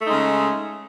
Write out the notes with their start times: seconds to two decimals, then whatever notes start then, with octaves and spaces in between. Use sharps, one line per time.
0.02 A3
0.05 D#4
0.08 G#3
0.12 C#3